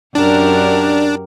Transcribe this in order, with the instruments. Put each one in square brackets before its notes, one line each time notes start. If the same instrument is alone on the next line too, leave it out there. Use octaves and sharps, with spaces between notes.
[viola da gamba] F#2 G4 A#4 [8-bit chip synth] D4